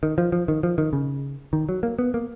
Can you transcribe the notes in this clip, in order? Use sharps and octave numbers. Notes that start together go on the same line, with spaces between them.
D#3
F3
F3
D#3
F3
D#3
C#3
D#3
F#3
A#3
B3
A#3